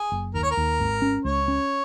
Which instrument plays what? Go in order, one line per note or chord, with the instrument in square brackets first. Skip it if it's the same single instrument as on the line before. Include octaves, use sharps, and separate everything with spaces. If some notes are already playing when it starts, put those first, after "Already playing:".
Already playing: [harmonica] G#4
[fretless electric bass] F#1
[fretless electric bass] D#2 [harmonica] A#4
[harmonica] C#5
A#4
[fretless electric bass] D#2
G#1
C#4
[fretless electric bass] C#2 [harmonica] C#5
[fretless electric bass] C#4